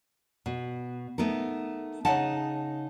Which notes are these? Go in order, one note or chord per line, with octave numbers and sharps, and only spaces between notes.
B2
A3 B3 D#4 A#4
C#3 D#4 D#5 F#5 A5